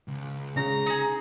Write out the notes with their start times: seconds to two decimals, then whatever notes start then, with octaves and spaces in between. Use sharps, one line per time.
0.08 C#2
0.57 C#3 A#5
0.86 D#4 G#4